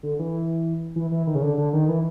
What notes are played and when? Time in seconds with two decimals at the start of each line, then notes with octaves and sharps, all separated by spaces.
0.03 D3
0.19 E3
0.96 E3
1.12 E3
1.27 D#3
1.35 C#3
1.42 D3
1.58 D3
1.73 D#3
1.88 E3